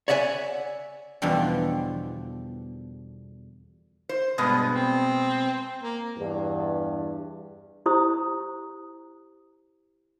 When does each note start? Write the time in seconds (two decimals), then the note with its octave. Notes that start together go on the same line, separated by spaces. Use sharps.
0.08 C#5 D5 E5 F#5 G#5
1.22 E2 B2 D3 F3 G3
4.09 C5
4.38 G2 B2 G#3 B3
4.74 C4
5.83 A#3
6.17 E2 G2
7.86 E4 G4 C5 A#5 D#6